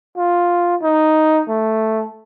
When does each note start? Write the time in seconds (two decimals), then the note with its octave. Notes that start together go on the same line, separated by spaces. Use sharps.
0.17 F4
0.82 D#4
1.48 A3